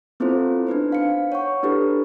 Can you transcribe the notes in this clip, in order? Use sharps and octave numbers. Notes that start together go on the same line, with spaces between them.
B3 C4 E4 F4 A4 C5
D4 D#4 B4 C5
F5 C#7
C#5 F#5 C#6
D4 E4 G4 A4 B4